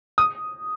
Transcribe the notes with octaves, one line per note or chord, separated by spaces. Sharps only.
D#6